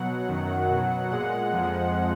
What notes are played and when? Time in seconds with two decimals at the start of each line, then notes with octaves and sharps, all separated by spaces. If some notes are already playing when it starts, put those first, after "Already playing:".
Already playing: B2 F#3 F#5
0.28 F#2 D#3 F#3
0.69 B2 F#3
1.10 A#2 G#3 F#5
1.51 F2 F3 G#3